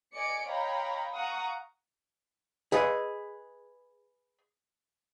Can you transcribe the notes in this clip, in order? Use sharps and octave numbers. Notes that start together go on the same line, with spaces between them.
D5 D#5 G#5 C#7 D7
C#5 D#5 F5 G5 A#5 B5
F5 F#5 A#5 C#6 D#6
G#4 B4 D#5